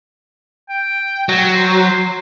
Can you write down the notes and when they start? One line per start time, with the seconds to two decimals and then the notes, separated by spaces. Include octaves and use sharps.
0.69 G5
1.29 F#3
1.55 C5